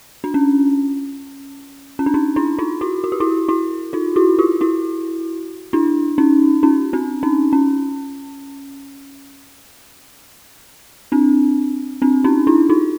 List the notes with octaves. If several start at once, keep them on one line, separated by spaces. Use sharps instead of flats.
D4
C#4
C#4
D4
C#4 D#4
D4 E4
D#4 F4
E4 F#4
F#4
G4
E4 F#4
E4 F#4
D#4 F4
E4 F#4
F4 G4
E4 F#4
D4 E4
C#4 D#4
C#4 D#4
C4 D4
C#4 D#4
C#4
C4 D4
C4 D4
C#4 D#4
D4 E4
D#4 F4